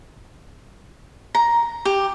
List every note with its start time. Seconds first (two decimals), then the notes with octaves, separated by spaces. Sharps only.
1.35 A#5
1.85 G4